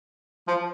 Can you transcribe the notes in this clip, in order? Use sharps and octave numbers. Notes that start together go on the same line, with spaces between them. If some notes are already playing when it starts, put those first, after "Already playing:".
F3